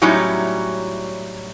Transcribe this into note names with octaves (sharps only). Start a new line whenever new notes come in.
A2 F#3 G3 C#4 D#4 E4